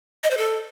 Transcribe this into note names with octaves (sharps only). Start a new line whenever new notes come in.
D#5
C5
A4